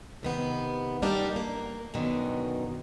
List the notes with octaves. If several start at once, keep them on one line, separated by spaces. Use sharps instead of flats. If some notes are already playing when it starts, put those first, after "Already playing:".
C3 D#3 B3
G3 A#3 D4 D#4 G4
A#3
F#2 B2 D3 D#3